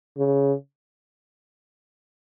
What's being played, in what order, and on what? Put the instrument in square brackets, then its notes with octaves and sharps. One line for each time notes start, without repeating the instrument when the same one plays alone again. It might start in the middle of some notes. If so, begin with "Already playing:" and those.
[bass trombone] C#3